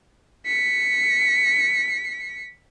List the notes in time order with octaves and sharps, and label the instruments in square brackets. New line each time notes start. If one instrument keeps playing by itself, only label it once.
[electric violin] B6 C#7